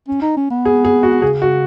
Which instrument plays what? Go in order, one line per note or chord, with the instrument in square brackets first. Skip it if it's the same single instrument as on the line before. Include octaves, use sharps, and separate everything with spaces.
[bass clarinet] C#4
D#4
C#4
B3
[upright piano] G#4
G#4
F#4
[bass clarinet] C#3 [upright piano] G#4
[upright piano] F#4